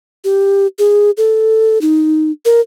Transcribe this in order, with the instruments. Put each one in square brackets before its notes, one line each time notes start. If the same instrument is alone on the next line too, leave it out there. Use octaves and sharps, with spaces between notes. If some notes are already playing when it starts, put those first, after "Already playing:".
[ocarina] G4
G#4
A4
D#4
A#4